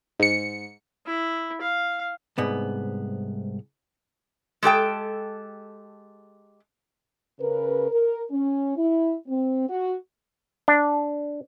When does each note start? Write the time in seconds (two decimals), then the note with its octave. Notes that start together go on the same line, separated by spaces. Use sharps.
0.19 G#2 C#7
1.06 E4
1.61 F5
2.38 C2 G#2 B3
4.63 G#3 G4 A4 G5
7.39 C#3 A#4 B4
7.90 A#4
8.30 C#4
8.77 E4
9.28 C4
9.68 F#4
10.68 D4